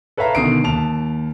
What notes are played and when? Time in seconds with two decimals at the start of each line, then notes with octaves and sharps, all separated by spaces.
0.17 A4 B4 C#5 E5 F5 A#5
0.35 B2 D3 D#3 D#6 C7 D7
0.63 D#2 A5 F7